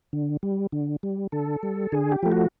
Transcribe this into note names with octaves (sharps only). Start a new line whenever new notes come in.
D3
G3
D3
G3
D3 A4
G3
D3 G#4
G4
F3 A3
F#4